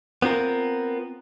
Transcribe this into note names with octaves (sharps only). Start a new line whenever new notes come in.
B3 C4 F4 A#4